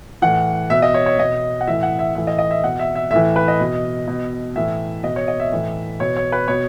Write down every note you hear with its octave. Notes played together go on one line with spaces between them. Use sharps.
A2 E3 F#5
B2 E5
D#5
C#5
C#5
B2 D#5
F#5
A2 E3 E5
F#5
E5
A2 E3 E5
D#5
D#5
E5
B2 F#5
E5
E5
A2 E3 E5
B4
D#5
B2
B2
A2 E3 E5
B2 D#5
C#5
D#5
E5
A2 E3
B2 C#5
C#5
B4
B2 C#5